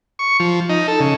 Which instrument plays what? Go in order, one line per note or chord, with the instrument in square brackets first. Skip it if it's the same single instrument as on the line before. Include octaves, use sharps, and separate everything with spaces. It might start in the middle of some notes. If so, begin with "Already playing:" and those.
[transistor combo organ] C#6
F3
D#4
A4
C#3